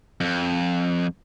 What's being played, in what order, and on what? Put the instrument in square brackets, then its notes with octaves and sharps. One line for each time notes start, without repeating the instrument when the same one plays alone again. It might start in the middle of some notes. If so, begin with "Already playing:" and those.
[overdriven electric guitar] F2